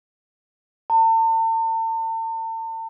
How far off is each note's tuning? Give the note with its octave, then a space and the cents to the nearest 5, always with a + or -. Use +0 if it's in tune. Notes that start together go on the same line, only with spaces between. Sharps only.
A5 +40